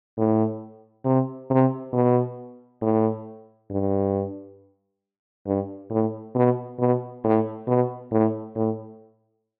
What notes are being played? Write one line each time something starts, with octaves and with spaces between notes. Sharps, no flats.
A2
C3
C3
B2
A2
G2
G2
A2
B2
B2
A2
B2
A2
A2